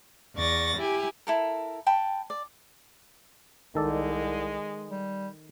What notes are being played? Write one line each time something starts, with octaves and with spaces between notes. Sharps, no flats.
E2 D5 C#6 A6 A#6
E4 G4 G#5
E4 A4 A#4
G5 A5 B5
D5
C2 D#3 G#3 A4 D5
G3